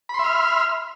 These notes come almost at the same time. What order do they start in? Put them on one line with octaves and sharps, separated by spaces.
B5 C6 E5 F6